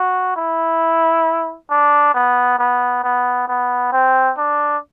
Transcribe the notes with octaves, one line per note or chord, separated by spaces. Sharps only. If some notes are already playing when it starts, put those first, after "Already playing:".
Already playing: F#4
E4
D4
B3
B3
B3
B3
C4
D4